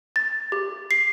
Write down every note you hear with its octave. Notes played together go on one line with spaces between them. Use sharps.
A6
G4
C7